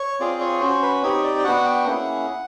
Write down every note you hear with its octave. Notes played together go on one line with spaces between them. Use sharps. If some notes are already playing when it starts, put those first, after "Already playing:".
Already playing: C#5
C4 F4 G#4 D5
C#5
C#4 F#4 C5
B4
C4 D#4 G4 C#5
D5
G5
B3 D4 F#4 F#5
G5
A#3 C#4 E4 G#4 F#5